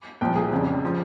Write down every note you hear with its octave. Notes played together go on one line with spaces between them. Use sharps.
C2 A#2 F3 G5
G#4
F1 F2 C#3
F3